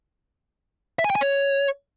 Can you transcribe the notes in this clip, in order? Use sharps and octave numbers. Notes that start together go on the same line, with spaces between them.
E5
G#5
G5
G#5
C#5